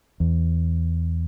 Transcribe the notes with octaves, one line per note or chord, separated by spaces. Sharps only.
E2